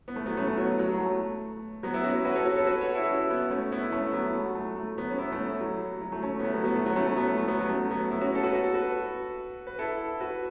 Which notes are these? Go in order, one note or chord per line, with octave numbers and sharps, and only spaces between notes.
B3
A3
F#3 B3
A3 C#4
A3 C#4
F#3 B3
F#3
F#3
A3
F#3 B3
B3 E4
C#4 F#4
F#4 B4
A4 C#5
F#4 B4
A4 C#5
F#4 B4
A4 C#5
E4 A4
C#4 F#4
B3 E4
A3 C#4
B3 E4
E4
A3 C#4
F#3 B3
A3
F#3
A3
A3
F#3 B3
C#4
B3 E4
A3 C#4
A3
F#3
F#3
A3
A3 C#4
B3
A3 C#4
F#3 B3
F#3 B3
A3
F#3 B3
A3 C#4
A3 C#4
F#3 B3
A3
A3
F#3 B3
F#3 B3
A3 C#4
F#3 B3
B3 E4
C#4 F#4
A4
F#4 B4
F#4
A4
F#4 B4
B4
E4 A4
F#4 B4